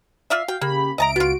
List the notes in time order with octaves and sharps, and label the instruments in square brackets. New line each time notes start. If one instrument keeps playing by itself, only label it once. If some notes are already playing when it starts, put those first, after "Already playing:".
[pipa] F4 D5 E5 [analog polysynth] F5
[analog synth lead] F#4 [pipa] G5
[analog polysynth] C#3 B5 [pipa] A#3 [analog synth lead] G4
[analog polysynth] C#2 D7 [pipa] D#5 A5 A#5 [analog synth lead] E5
[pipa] B3 F4 [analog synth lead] F#4